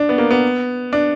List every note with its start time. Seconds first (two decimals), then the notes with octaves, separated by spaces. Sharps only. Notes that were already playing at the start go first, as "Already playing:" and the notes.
Already playing: D4
0.09 B3
0.18 A#3
0.31 B3
0.93 D4